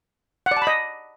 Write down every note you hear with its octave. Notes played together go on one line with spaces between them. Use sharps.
F#5
D5
A5
B5
D#5